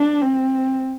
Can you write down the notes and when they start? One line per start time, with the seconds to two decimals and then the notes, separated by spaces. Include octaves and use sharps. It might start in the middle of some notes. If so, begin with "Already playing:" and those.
Already playing: D4
0.21 C4